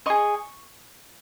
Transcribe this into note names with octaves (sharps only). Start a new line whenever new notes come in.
G#4 D#5 C#6